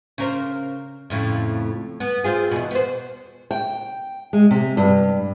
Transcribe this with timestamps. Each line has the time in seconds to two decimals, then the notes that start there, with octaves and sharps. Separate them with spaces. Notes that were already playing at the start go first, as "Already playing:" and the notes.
0.18 C#3 A#4 C5
1.10 F2 A2 C#3
2.00 B3
2.24 C4 F4 G#4
2.51 E2 B2
2.71 B3 C5
3.51 G5
4.33 G#3
4.51 C3
4.77 G2